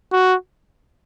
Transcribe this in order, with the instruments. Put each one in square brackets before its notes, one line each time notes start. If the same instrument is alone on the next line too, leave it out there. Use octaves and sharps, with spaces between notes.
[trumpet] F#4